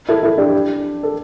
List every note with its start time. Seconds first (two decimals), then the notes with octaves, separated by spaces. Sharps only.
0.09 E4 A4
0.23 E4 A4
0.38 D4 G4
1.03 A4